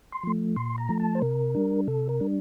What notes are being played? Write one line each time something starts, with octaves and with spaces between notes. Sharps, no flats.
C6
F3 A3
A#2 C6
A#5
F3 A3
A5
C5
C3 A#4
G3 D4
C3 A4
A#4
G3 D4